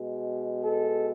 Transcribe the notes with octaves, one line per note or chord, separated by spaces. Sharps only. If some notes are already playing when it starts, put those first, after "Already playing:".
Already playing: B2 G#3
A4